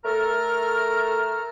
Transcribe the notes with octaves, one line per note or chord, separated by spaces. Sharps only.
A3 A4 A#4 A#5 F6